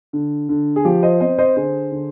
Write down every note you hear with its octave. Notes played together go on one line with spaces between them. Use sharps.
D3
D3
G#4
F3 G4
C5 D#5
C4 C5 D#5
C5 D#5
D3 G#4 C5
D3